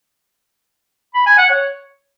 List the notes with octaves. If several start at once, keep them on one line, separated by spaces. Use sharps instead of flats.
B5
G#5
F#5
C#5